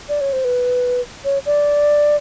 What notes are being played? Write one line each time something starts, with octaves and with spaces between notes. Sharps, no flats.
D5
C#5
C5
B4
C#5
D5